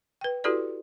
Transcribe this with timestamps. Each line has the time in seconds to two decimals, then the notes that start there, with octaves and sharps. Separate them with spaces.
0.21 B4 G5
0.44 E4 F#4 G4 A4 B4 D5